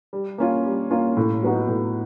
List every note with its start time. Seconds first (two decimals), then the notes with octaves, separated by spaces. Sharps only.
0.13 G3
0.38 A#3 C#4 F4
0.65 G3
0.91 A#3 C#4 F4
1.17 A2
1.43 F#3 B3 D#4 F#4
1.68 A2